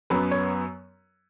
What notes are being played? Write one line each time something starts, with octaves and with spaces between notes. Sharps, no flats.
F#2 F#3 B3 B4
C#5